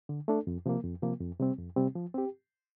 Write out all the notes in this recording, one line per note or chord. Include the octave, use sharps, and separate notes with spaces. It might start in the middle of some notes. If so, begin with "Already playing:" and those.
D3
A3 D4 A4
F2
C3 F3 A#3
F2
C3 F3 A#3
F2
C3 G3 C4
F2
C3 G3 C4
F3
C4 G4